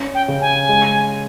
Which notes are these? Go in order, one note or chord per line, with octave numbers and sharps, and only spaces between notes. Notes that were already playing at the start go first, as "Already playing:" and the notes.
Already playing: C#4
G5
C#3
G#5
G#3